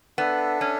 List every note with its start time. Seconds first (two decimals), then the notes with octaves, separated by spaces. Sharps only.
0.18 B3 D4 A4 E5
0.61 C#4